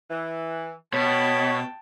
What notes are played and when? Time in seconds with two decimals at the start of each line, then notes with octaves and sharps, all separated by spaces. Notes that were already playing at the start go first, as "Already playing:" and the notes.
0.10 E3
0.93 B2 C#5 G5 A5 B5